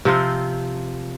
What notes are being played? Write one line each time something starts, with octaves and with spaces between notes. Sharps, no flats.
C3 F3 C4 F4